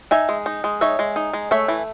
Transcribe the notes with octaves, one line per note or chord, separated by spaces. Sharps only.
D#4 E5 G#5
G#3
D#4
G#3
D#4 C#5 E5
G#3
D#4
G#3
A3 C#5 E5
E3